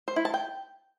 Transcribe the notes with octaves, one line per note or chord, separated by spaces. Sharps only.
C5
E4
A5
G5